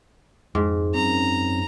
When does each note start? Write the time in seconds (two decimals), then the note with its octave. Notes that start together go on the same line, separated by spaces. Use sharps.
0.55 F2 G#2
0.94 F#2 C4 A#5